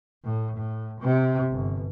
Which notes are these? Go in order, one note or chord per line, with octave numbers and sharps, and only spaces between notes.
A2
A2
C3
G1